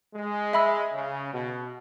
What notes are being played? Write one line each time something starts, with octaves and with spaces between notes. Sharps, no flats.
G#3
E5 B5 E6
C#3
B2